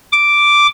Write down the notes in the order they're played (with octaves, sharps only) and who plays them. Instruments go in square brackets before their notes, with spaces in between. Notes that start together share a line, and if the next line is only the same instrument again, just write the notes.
[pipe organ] D6